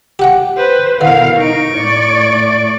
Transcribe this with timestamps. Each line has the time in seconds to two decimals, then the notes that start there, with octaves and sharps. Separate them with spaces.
0.19 G4 F#5 G5
0.57 B4 C5
1.01 B2 D3 E4 A#4 F5
1.38 D#4 C#6 D7
1.75 A2 D5